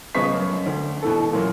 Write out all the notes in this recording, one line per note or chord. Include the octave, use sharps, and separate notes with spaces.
D#1 C#3 B3 D#5 C#6 B6
F#2
D2
B2 E3 A4
F#2 A#2 E3